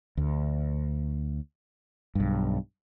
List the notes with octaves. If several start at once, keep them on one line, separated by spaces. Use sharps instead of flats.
D2
B1 G2